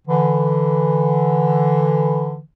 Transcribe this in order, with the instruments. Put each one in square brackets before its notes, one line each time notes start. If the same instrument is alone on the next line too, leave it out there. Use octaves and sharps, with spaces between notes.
[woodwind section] D3 E3